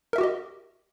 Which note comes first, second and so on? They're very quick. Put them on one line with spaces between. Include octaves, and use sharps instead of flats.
A#4 E5 F#4 G4 D#5